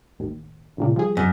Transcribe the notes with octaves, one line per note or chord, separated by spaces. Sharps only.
A1 D#2
G1 C#2 A#2
F3 G3 G#4
F#2